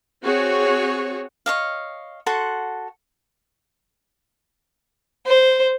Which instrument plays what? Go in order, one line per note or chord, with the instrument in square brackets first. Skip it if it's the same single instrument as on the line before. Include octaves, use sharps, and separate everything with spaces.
[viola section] C4 F#4 G#4 C#5
[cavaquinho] C#5 D#5 F5
F#4 A4 F#5 C6
[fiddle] C5